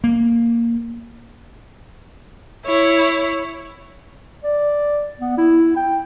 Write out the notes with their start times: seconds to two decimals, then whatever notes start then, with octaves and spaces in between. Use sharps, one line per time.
0.04 A#3
2.65 E4 C#5
4.44 D5
5.20 B3
5.38 E4
5.76 G5